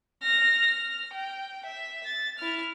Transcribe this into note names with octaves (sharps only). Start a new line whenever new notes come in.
F6 A#6
F6
G5
E5
A6
E4 F6